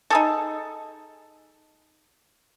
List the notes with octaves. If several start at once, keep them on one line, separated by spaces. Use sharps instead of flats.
D#4 G#4 A4